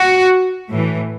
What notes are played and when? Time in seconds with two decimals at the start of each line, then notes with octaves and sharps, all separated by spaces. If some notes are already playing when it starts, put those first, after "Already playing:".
Already playing: F#4
0.70 A2 E3